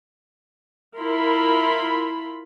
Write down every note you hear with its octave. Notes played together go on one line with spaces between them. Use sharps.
E4 F4 A#4 B5 C6